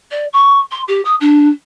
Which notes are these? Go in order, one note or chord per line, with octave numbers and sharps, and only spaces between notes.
D5
C#6
C6
G4
D#6
D4